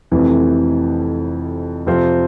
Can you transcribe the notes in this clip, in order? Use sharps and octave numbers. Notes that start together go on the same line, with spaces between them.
F1 F2 C3 E3
F2 C3 F3 C4 F4